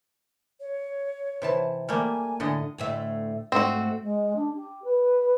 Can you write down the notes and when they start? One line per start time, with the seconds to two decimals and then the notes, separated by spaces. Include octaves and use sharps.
0.60 C#5
1.42 C3 E3 A5
1.89 G3 A3 A#3 G#5
2.40 A2 D3 D#5
2.78 D2 A2 E5
3.52 G#2 A3 C4 F#4
4.02 G#3
4.36 D4
4.55 G4
4.84 B4